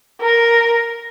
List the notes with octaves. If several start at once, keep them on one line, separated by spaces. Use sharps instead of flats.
A#4